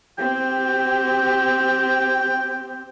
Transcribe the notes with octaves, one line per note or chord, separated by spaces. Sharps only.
C4 G4 G5